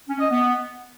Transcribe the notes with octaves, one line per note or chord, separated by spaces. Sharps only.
C#4
D#5
B3